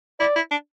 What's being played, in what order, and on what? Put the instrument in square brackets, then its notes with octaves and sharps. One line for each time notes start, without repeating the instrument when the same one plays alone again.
[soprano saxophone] E4 [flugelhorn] D5
[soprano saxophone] E4
D4